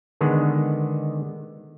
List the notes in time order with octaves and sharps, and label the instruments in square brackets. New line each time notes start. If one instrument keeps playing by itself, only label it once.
[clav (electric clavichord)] D3 D#3 G#3 B3